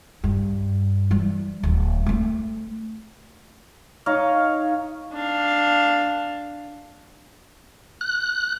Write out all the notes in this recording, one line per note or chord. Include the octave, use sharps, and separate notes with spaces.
G2
E3 G3
D1
A3 C4
D#4 C#5 D#5 F5
D4 F5
F#6